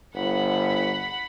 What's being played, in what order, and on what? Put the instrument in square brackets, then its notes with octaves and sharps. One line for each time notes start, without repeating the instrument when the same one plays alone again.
[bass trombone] G1 [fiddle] F#5 B5